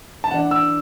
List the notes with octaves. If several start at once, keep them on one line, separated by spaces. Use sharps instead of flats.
A5
E3 D4 F#5
E6